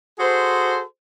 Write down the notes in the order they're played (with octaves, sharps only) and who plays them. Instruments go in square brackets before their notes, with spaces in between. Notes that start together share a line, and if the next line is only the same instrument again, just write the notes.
[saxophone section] F#4 G#4 A4 C5